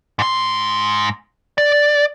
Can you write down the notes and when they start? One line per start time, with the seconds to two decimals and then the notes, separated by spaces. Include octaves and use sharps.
0.19 G#2 C6
1.58 D5